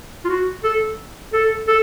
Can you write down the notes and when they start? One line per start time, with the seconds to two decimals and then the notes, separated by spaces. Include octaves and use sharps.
0.25 F4
0.29 F#4
0.63 A4
1.33 A4
1.68 A4